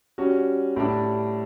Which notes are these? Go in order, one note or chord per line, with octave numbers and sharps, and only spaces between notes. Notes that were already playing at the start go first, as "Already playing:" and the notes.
G3 C#4 F#4
A2 G3 D4